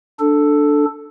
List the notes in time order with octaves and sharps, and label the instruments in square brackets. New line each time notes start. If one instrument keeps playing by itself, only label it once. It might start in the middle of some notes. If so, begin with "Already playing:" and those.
[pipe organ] D4 A4